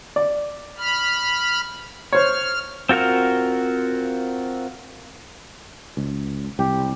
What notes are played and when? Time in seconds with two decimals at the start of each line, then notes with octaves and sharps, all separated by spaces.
0.16 D5
0.78 B5 F6
2.12 C5 C#5 F6
2.89 C4 F4 F#4 A#4 F6
5.97 C#2
6.59 C2 G4